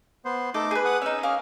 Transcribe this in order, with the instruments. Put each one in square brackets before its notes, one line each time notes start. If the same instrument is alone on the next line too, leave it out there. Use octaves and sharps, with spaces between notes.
[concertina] B3 C5
[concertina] A3 D#4 D6 [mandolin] A4
[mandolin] G#4 B4
[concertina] F#5 D#6
[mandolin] C#4 D#4 [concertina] E6
[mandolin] A#3 [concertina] C#4 G#4 F6